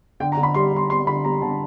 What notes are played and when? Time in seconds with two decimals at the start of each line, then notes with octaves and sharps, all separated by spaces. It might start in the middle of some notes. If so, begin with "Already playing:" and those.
0.20 D3 G5
0.32 A#5
0.37 D3
0.43 B5
0.54 G3 C6
0.73 G3 C6
0.90 G3 C6
1.07 D3 B5
1.24 G3 A#5
1.42 D3 A5